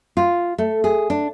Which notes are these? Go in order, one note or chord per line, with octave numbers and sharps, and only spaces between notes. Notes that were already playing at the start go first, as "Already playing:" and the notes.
F4
A3
G#4
D4